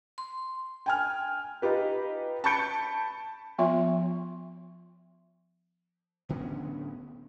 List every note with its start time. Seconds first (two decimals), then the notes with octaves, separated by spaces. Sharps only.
0.18 C6
0.86 G5 G#5 F6
1.62 D#4 F4 G4 B4
2.44 A5 B5 C#6 G6 C#7 D7
3.58 F3 B3 F4 E5 C6
6.29 D1 D3 B3 C#4